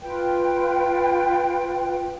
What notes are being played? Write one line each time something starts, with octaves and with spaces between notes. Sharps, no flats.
F4 B4 G5